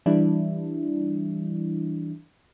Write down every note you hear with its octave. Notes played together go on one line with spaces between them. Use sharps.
E3 G3 D4 E4